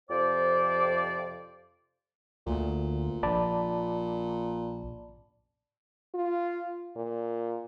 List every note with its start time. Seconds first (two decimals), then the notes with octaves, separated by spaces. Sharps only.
0.10 F2 C3 F3 C5 D5
2.47 D2 A#2
3.23 A#1 D5 A5 B5
6.15 F4
6.96 A#2